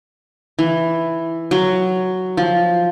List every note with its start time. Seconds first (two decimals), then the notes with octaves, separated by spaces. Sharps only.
0.59 E3
1.51 F#3
2.37 F3